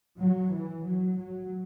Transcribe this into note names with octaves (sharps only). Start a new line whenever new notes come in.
F#3
E3
F#3
F#3